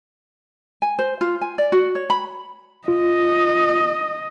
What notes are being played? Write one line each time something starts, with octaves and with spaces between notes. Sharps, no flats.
G#5
C5
F4
G#5
D5
F#4
C#5
B5
F4 D#5